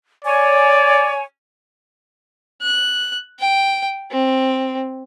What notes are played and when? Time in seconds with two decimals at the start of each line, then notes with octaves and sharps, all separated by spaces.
0.25 C#5 D5 G#5
2.62 F#6
3.40 G5
4.11 C4